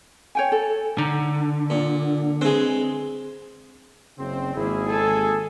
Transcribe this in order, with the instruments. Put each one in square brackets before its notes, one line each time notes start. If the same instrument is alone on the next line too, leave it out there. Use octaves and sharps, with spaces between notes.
[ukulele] C#5 G5 G#5
A4
[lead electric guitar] D3 [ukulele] D#4 A#5
[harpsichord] A#2
[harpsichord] G#3 C4 [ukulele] B4
[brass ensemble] F#1 C#3 C4
[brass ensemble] G#1 G#4 [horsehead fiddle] A#3 E4
[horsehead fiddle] A4 G#5